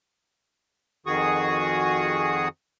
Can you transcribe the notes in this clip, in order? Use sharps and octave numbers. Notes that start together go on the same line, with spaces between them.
F2 D#3 F#4 G#4 C#6 D#6